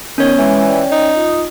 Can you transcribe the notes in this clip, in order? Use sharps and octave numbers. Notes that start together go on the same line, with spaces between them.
D#3 B3 C#4 C#5
E3 G#3
D5 G5
D#4
F4 D#6